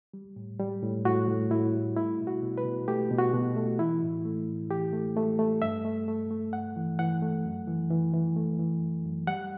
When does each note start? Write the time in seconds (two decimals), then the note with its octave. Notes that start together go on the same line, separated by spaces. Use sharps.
0.14 G3
0.36 A2
0.60 G3
0.82 A2
1.05 A2 F#4
1.28 A2
1.51 A2 E4
1.74 G3
1.96 A3 E4
2.19 B2
2.27 F#4
2.42 B2
2.58 B4
2.65 B2
2.88 A3 G4
3.11 B2
3.18 F#4
3.33 B2
3.56 A3
3.79 E3 E4
4.02 A2
4.25 A3
4.48 A2
4.71 E3 G4
4.93 A3
5.17 A3
5.39 A3
5.62 G2 E5
5.85 A3
6.08 A3
6.31 A3
6.53 G2 F#5
6.76 E3
6.99 E3 F#5
7.22 A3
7.45 F#2
7.68 E3
7.90 E3
8.13 E3
8.36 A3
8.59 E3
8.82 F#2
9.05 F#2
9.27 G3 F#5